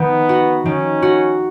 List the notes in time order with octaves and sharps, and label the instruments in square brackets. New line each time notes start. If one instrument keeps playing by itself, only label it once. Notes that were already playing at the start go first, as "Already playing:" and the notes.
Already playing: [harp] D#3 [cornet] B3
[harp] F#4
[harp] D#3 [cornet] C#4
[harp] F#4